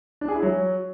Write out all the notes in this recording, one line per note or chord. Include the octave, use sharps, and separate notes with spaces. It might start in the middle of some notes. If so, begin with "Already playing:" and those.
D4
G#4
E4
F#3